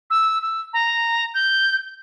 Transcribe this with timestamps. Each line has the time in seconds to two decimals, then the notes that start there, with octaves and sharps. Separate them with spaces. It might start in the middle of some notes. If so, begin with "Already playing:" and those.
0.10 E6
0.42 E6
0.73 A#5
1.34 G6